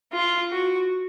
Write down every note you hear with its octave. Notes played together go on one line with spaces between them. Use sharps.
F4
F#4